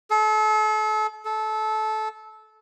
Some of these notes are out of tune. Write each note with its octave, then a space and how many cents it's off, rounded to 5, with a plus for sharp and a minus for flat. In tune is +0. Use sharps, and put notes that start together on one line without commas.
A4 -35
A4 -20